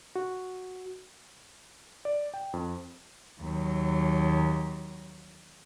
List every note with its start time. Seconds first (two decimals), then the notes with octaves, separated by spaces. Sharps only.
0.16 F#4
2.05 D5
2.34 G5
2.53 F2
3.40 D#2 F#3